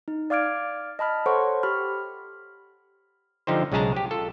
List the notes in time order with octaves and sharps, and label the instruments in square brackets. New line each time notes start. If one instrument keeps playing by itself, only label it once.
[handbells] D#4
D5 F5 D6 F6 G#6 D7
D#5 A5 B5 F6
A4 C5 C#5 F#5 C6 C#6
G4 B5 F6
[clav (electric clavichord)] D3 F3 D#4 G4 C5
B1 C#3 G#3 G#4 A5 A#5
G4
F4 A4